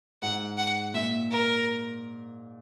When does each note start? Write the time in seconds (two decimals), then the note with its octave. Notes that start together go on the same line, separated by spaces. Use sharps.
0.22 G#2 F#5
0.57 F#5
0.94 A#2 E5
1.31 A#4